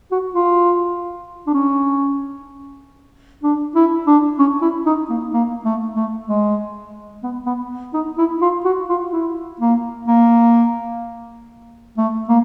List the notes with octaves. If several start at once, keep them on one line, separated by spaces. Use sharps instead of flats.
F#4
F4
D4
C#4
D4
E4
D4
C#4
E4
D#4
A#3
A#3
A3
A3
G#3
B3
B3
D#4
E4
F4
F#4
F4
E4
A#3
A#3
A3
A#3